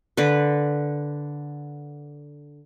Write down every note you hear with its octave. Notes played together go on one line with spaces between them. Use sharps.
D3 B4